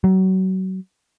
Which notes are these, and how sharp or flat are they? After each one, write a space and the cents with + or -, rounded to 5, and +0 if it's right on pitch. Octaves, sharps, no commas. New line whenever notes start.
F#3 +30